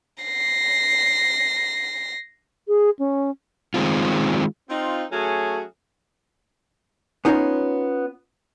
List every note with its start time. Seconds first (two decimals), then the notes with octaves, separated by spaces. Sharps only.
0.24 A#6 C7
2.68 G#4
2.99 C#4
3.74 D#3 G#3 C4 F4
4.70 C4 D#4 F4
5.11 F#3 A3 C#4 F#4 G#4
7.25 B3 C#4 D#4 F4 B4 C#5